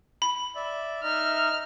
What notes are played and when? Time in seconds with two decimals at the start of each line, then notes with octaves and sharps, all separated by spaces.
0.22 B5
0.56 D5 E5
1.03 D#4 D#5 E5 F6